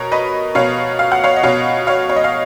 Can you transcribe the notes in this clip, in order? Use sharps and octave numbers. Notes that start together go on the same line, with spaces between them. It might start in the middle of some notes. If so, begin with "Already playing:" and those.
Already playing: B2 A#4 C#5
B4 D#5
B2 C#5 F5
F5
F#5
C#5 F5
D#5
B2 C#5 F5
C#5 F5
C#5
D#5
F5